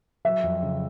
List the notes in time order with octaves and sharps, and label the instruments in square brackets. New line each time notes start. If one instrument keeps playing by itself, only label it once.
[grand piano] F#3 [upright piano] E5
[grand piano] F2
C#3